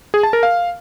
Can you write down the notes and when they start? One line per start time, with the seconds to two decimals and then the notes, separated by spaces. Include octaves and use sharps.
0.14 G#4
0.23 A5
0.33 A#4
0.43 F5